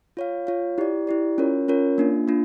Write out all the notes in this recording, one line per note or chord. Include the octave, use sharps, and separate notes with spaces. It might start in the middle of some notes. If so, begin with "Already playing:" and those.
F4 C#5 F5
F4 C#5 F5
E4 G4 D5
E4 G4 D5
C#4 F4 A#4 C#5
C#4 F4 A#4 C#5
A#3 D4 F4
A#3 D4 F4